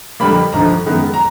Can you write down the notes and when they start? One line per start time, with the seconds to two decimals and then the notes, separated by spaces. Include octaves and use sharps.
0.20 F2 D3 G3 A#3 B5
0.53 G#1 G2 D3 F3 A#5
0.86 F#2 D#3 G#3 B3
1.14 A#5